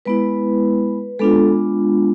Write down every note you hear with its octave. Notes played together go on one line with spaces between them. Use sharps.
G#3 B3 E4 B4
G#3 B3 D4 F4 A4